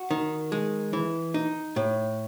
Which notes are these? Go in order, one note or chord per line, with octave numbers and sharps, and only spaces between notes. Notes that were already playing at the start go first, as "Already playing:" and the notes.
Already playing: F#4
D#3
G#3
E3
D#4
A2